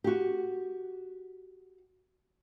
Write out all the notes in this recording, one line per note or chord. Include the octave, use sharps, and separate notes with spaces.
F#4 G4